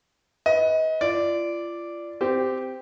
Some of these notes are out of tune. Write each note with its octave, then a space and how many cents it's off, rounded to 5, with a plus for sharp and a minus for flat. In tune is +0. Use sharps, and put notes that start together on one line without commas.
B4 +0 D#5 +30
F4 -30 D5 +0
C4 -20 G4 +0